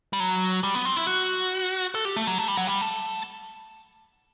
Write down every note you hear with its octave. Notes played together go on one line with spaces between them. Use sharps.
G3
F#3
G3
B3
C4
E4
F#4
A4
G4
A3
F#3
A3
G3
F#3
G3
A3